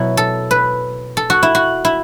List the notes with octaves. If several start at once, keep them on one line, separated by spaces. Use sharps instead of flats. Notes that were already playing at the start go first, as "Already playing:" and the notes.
Already playing: B2 F#3 E4
A4
B4
A4
F#4
E4
F#4
E4